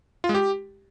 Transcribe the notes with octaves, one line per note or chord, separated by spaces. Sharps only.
F4
G#3
G4